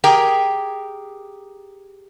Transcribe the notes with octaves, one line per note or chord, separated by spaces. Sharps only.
G4 G#4 A#4 G5